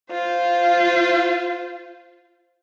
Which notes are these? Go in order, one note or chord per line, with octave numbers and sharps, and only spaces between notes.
F4 C5